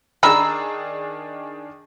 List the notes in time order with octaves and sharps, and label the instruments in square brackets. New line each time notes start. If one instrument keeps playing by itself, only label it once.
[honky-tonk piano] D#3 D4 G#4 [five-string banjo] A#5 [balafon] B5 [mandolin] E6